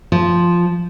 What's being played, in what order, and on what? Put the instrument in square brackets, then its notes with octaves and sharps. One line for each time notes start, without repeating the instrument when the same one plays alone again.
[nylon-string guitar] F3